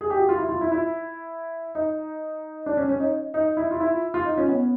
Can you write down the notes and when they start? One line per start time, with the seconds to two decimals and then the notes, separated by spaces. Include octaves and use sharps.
0.01 G#4
0.10 G4
0.19 F#4
0.29 F4
0.38 E4
0.49 F4
0.61 E4
0.72 E4
1.75 D#4
2.66 D4
2.77 C#4
2.89 C#4
3.00 D#4
3.34 D#4
3.57 E4
3.71 F4
3.80 E4
4.14 F4
4.25 D#4
4.37 C#4
4.49 B3